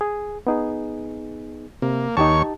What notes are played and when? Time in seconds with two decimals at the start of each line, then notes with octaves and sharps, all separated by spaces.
0.01 G#4
0.47 B3 D#4 G#4
1.82 C3 A#3
2.17 D#2 D#4 G4 C#5 A5 C#6